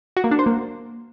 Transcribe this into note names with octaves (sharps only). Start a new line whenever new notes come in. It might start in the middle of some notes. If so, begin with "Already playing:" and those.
F#4
A#3
D4
C5
A#3